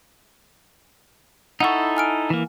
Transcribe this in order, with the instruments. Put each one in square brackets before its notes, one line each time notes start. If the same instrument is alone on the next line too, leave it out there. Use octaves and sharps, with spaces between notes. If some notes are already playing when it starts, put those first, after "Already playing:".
[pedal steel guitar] D#4 E4 A4 [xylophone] F#5 C#6
[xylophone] G#5 F6 D7
[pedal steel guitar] E3 A#3